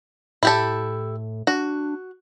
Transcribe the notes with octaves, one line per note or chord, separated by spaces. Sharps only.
A2 E4 G4 A4
D4 F#4